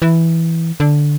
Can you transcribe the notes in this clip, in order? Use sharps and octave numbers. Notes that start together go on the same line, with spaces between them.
E3
D3